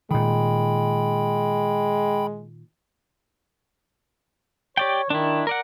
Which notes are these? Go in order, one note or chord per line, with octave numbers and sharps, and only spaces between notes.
A#2 D#3 G#3 G5 B5
G4 C#5 D5 G5
D#3 D4 E4
A#4 D5 F#5